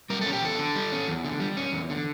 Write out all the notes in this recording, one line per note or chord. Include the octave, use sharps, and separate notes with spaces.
G3 A#4
A4
C#4
G4
E2 A4
D3
G3
C#4
E2
D3
G3
C#4
E2
D3